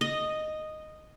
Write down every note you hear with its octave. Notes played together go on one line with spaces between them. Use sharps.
D#5